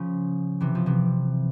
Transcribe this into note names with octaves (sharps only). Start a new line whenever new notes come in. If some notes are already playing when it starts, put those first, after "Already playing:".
Already playing: C#3 F3
C3 E3
F3
C3 E3